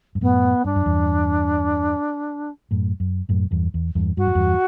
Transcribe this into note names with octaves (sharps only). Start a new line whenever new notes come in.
G2
F#2 A2 B3
G2 D4
F#2
E2 G2
F#2 A2
F#2
F#2 A2
E2 G2
E2
E2 G2
G2 F#4
F#2
E2 G2